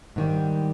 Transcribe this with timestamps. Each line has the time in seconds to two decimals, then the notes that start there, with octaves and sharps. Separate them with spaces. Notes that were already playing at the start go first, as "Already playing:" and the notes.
0.16 G#2 D#3 G3